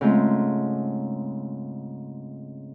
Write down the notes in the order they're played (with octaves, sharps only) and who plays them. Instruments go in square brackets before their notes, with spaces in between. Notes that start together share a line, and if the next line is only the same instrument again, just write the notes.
[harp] G#2 C#3 A3 C4 F4